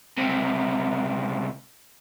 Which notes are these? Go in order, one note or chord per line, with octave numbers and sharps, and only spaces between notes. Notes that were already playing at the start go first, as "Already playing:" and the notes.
C#2 C3